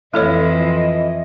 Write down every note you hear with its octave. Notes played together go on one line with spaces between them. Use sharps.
F2 E3 F3 A3 E4 A4 C#5 D#5